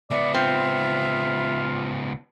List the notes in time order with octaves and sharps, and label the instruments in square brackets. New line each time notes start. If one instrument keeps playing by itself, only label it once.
[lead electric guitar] C#2 B3 [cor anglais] D5 [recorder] E5
[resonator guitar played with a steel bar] C4 [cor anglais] F4